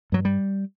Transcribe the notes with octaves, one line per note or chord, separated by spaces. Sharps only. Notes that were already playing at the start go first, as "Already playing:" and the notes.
G2 F#3
G3